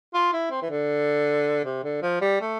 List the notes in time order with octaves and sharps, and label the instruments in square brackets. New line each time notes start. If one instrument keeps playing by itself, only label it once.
[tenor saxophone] F4
E4
C4
E3
D3
C3
D3
F3
G3
A3